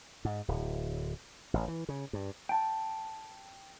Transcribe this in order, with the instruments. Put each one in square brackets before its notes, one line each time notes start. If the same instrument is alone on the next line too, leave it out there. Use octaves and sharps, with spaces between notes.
[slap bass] G#2
D1
A1
E3
C#3
G2
[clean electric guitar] G5 A5